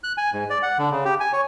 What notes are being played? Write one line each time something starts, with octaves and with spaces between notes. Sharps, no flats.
F#6
G#5
G#2
D5
F#5
D3
C#3
G4
G#5
C#5